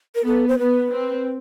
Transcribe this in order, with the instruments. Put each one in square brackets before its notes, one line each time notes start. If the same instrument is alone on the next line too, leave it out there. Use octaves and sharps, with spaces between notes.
[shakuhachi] A#4
[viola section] B3 [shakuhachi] A4
[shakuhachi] C5
[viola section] B3 [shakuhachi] B4
[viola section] C4